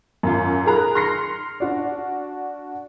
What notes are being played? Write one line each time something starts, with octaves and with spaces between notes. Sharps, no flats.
F#2 F4
G#4 A#4 A#5 B5 F#6
C6 F6 A#6 C7 C#7
D4 F#4 D5